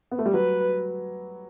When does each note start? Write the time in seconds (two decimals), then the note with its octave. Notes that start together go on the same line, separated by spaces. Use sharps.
0.11 B3
0.19 A3
0.26 G3
0.33 F#3 B4